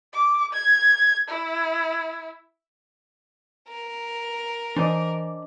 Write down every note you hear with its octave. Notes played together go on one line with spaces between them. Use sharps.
D6
G#6
E4
A#4
E3 D4 C5 D#5